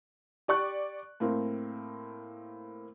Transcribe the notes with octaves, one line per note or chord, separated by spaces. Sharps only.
G4 D5 C#6 F#6
A2 A#3 C4